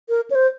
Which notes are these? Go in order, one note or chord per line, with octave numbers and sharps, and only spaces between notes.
A#4
C#5
C5